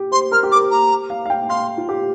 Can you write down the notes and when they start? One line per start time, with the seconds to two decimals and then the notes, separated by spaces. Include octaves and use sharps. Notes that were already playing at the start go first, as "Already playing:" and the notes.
Already playing: G4
0.12 C5 C6
0.32 A#4 F6
0.43 G4
0.51 D6
0.56 A#4
0.70 A#5
1.10 F5
1.26 F5
1.30 G5
1.49 F5 C6
1.78 F4
1.89 G4